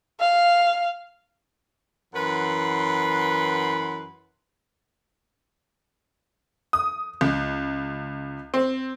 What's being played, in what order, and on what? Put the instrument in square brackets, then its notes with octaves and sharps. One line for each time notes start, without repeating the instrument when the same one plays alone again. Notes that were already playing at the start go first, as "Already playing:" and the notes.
[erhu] F5
[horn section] F#2 E3 B4 F#5 C6
[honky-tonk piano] D#6
C#2
C4